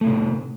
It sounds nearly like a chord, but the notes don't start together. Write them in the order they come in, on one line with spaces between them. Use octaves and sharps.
A3 A2 C3